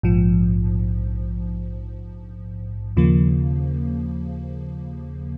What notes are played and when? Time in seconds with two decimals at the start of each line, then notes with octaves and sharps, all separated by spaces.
0.03 A#1 G#2 F3
2.97 D#2 C#3 F3 A#3